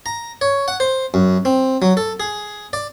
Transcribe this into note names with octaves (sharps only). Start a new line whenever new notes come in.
A#5
C#5
F#5
C5
F#2
C4
F#3
A4
G#4
D5